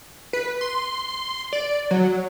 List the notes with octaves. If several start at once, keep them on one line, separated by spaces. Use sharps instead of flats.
B4
C6
D5
F#3